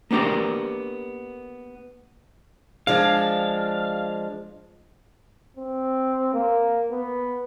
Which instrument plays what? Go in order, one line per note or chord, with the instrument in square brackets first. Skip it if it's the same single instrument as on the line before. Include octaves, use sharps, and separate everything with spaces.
[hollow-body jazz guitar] A#3 B3 D4 G4 A#4
[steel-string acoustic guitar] F3 G#3 D4 [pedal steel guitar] F5
[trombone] C4
A#3
B3